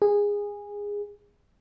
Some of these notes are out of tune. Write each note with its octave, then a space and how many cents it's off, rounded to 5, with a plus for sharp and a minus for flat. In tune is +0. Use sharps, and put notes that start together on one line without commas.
G#4 -20